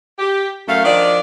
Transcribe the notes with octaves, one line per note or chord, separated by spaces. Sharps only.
G4
F#2 A3 F5
D#3 F3 D4 F4 D5